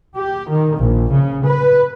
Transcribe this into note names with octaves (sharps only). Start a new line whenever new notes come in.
G4
D#3
A#1
C#3
B4